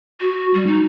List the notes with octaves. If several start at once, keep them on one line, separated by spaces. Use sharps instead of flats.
F#4
G3
D#4